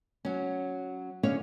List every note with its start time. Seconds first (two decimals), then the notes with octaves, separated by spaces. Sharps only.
0.25 F#3 C#4
1.23 D3 C#4 G#4 C#5 F5